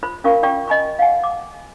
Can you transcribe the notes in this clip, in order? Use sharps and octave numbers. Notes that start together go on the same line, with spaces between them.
F4 C5 B5
C#4 F4 A#4 F5 C#6
F4 D5 G5 C#6
D#5 G#5 B5 C#6
F5 F#5 G#5
D6